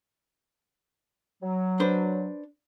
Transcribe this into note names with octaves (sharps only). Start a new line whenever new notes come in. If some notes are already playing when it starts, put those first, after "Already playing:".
F#3
D4 B4 C5